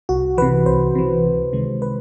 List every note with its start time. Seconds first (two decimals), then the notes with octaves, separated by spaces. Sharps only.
0.09 C2 F#4
0.38 C3 E3 B4
0.66 C2 C5
0.95 C3 E3
1.24 C#2
1.53 C3 D#3 G#3
1.82 B4